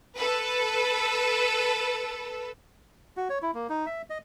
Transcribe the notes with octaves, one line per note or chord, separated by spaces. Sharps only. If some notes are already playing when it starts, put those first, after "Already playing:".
A4 B4
F#4
C#5
E4
A#3
D#4
E5
D#5